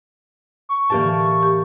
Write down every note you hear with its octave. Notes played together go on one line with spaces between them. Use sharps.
C#6
A2 D3 E3 A#3 G4 A5
G4